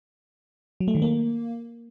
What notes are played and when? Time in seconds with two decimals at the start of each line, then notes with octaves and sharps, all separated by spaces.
0.80 F#3
0.88 A3
0.95 D#3
1.02 A#3